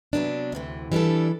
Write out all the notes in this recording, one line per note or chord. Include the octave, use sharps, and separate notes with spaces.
C3 F#3 B3 D4
D2 C3 E3
E3 G3 D4 A4